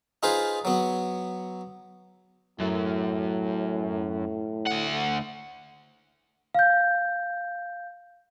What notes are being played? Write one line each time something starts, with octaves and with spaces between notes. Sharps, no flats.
D#4 F4 G#4 B4 C5
F#3 B3
F#2 A2
D2 F#5
F5 G6